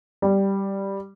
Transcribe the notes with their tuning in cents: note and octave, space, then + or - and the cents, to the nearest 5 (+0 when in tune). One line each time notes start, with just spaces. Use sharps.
G3 +0